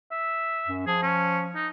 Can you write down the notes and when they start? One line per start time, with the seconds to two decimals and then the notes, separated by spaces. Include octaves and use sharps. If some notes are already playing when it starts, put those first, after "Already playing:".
0.11 E5
0.68 F#2
0.87 F3 G#4
1.02 C#4
1.55 D#4